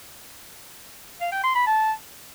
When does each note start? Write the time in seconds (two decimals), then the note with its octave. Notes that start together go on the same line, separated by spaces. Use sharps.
1.21 F5
1.32 G5
1.43 C6
1.55 B5
1.66 A5